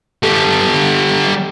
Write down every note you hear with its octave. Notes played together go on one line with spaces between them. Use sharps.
G3 A4